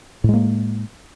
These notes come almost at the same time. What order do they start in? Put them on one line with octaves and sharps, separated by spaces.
A2 G#3 A#3